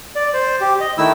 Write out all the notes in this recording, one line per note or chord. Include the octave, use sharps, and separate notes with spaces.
D5
C5
G4
D#5
D#3 A3 E4 E6